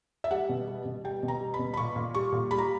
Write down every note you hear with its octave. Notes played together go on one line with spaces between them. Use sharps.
E5
G3 F#5
B2
G3
B2
G3 G5
B2
A#5
G3
B5
B2
B5
A#2 C#6
A#2
G3 C#6
A#2
G3 B5
A#5